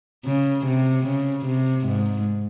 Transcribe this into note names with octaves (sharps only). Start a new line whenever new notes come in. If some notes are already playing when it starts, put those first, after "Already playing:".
C#3
C3
C#3
C3
G#2